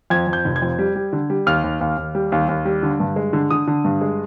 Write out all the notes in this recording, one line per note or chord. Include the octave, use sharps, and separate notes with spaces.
F2 G#6
F2
G6
F1
G#6
F2
G3
G3
D3
G3
D#2 F6
D#2
D#2
D#2
G3
D#2
D#2
G3
D3
G2
G#3
D3
D3 D#6
D3
G2
G#3